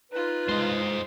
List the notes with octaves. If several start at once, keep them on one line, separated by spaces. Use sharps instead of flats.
D#4 F4 B4
G#3 C5 D#5